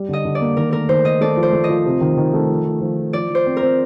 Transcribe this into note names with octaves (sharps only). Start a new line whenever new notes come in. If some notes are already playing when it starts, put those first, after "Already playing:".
Already playing: G3
D3 D#5
D3
D5
A#3
D#3 A#4
A3 A#4
D#3 C5
D#3 D#5
A3 D5
F3
C5
A3
D#5
F3
C3
D#3
D#3
A3
F3
F3
F3
F3
F3 D5
F3
C5
C4
A#4
C4